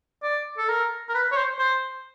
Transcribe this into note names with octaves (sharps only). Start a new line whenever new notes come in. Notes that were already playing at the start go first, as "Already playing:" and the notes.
D5
A4
A#4
A#4
B4
C#5
C5
C5